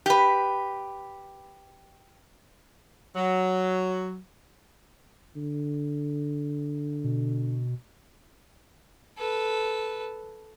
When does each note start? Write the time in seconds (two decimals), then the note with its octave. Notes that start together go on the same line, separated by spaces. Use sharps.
0.06 G4 B4
3.16 F#3
5.36 D3
7.04 B2
9.18 A4 B4